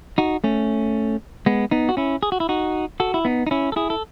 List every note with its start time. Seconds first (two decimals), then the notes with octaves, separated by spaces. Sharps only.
0.18 D#4 F#4
0.44 A3 C#4
1.46 G#3 B3
1.71 B3 D#4
1.89 F#4
1.97 C#4 E4
2.23 G#4
2.32 F#4
2.40 E4
2.49 D#4 F#4
3.00 F#4 A4
3.14 E4
3.25 B3 D#4
3.47 D#4
3.51 C#4 E4
3.72 A4
3.76 E4 G#4
3.90 A4